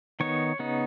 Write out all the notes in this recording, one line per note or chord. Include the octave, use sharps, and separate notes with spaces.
D#3 B3 D#4 C#5
C#3 B3 D#4